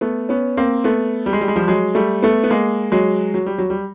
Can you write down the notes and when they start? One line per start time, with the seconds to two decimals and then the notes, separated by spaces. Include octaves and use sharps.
0.01 A3 B3
0.29 B3 C#4
0.57 A#3 C4
0.84 A3 B3
1.26 G3
1.33 G#3
1.41 G3
1.48 G#3
1.56 F3 G3
1.68 F#3 G#3
1.95 G3 A3
2.22 A3 B3
2.44 B3
2.50 G#3 A#3
2.92 F#3 G#3
3.34 F#3
3.46 G3
3.58 F#3
3.70 G3